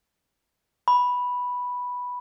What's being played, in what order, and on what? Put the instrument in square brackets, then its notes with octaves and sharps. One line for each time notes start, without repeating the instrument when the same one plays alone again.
[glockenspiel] B5